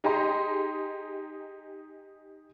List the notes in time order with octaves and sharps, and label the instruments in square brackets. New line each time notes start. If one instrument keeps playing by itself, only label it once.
[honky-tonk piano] D#4 G4 G#4 D#5 C6